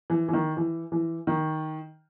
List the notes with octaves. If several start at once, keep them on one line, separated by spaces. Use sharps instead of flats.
E3
E3
D#3
E3
E3
D#3